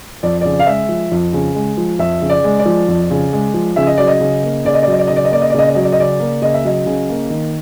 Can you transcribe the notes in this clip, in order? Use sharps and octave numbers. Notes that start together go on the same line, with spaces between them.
F2 D5
C#3 D5
F5
G#3 E5
F3
F2
C#3
G#3
F3
F2 E5
C#3
D5
G#3
D5
F3
F2
C#3
G#3
F3
C#3 E5
D#5
F#3 D5
D#5
C#3
A#3
C#3 D5
D#5
D5
F#3 D#5
D5
C#3 D#5
D5
D#5
A#3 D5
D#5
D5
C#3 D#5
D5
F#3 D#5
D5
D#5
C#3 D5
A#3
C#3 D#5
E5
F#3 D#5
C#3
A#3
D#3